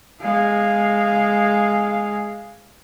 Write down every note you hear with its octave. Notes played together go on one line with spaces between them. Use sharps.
G#3 F5